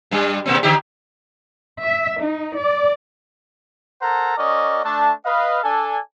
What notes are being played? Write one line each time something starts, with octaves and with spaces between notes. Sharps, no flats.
G2 G3
B2 A#3 C4
D3 D#4 G4
E5
D#4
D5
A4 A#4 C5 F#5 A5 A#5
C#4 F#4 A#4 D5 D#5
A3 D4 A5
B4 D#5 F5
D4 A4 G#5